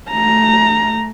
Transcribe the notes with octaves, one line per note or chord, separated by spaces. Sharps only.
A3 A#5